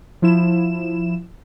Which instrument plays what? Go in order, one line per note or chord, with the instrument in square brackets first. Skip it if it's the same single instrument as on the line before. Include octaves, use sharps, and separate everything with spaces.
[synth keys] F3 E4 E7